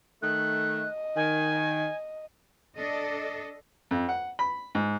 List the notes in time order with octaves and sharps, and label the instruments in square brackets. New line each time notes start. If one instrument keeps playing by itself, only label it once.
[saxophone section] D#3 A3 [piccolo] F#6
[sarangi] D#5
[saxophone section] D#3 [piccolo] G#5
[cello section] D4 A4 D#5
[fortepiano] F2
F#5
B5
G#2